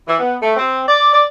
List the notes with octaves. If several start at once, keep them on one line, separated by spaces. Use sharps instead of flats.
E3
B3
A3
C4
D5
D5